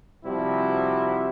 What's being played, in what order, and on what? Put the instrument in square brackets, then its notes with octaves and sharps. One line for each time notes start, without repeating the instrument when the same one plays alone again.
[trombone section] C3 F3 G3 C4 E4 F#4